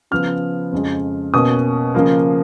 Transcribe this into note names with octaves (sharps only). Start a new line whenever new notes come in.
C#3 F3 B3 F6
F2 C#3 G#3
B2 A#3 C#4 D#6
C#3 F3 A#3